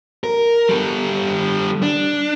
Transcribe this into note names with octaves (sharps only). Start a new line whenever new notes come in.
A#4
G3 A4
D4